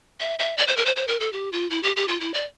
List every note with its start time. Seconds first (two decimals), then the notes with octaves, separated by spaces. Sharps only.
0.20 E5
0.39 E5
0.58 D5
0.67 C5
0.77 A#4
0.86 C5
0.96 C5
1.08 A#4
1.20 A4
1.33 G4
1.53 F4
1.70 E4
1.83 G4
1.96 G4
2.08 F4
2.21 E4
2.34 D5